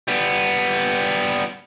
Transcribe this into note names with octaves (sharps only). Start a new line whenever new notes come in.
G3 B3